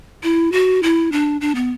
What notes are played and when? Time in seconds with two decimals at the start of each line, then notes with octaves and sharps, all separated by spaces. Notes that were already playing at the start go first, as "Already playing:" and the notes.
0.23 E4
0.52 F#4
0.83 E4
1.12 D4
1.41 D4
1.55 B3